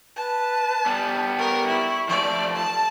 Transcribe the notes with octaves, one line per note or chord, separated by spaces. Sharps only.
B4 A5
G3 B3 G#5
A#4 C#6
E4
F3 A3 D5
A5